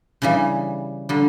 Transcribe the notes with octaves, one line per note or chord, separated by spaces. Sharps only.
C#3 E3 G3
D3 G3